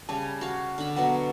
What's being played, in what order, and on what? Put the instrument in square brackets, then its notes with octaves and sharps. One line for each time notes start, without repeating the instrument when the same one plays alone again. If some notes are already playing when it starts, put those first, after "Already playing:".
[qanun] C#3 G3 [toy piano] A5
[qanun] F#4 F5
D3 B5
[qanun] B2 F#3 B4 [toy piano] F#5